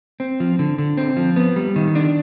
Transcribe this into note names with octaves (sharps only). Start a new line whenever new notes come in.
C4
F3
D3
D3
C4
F3
B3
G3
D#3
D4